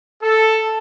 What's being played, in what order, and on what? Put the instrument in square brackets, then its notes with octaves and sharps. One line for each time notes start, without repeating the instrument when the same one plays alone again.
[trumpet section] A4